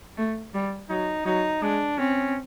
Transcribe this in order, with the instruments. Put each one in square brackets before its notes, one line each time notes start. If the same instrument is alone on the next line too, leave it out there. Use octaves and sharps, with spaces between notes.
[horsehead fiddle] A3
G3
[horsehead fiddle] F#3 [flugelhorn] D#4
[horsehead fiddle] F#3 [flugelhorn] D#4
[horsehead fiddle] G#3 [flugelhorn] D4
[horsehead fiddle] C4 [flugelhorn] C#4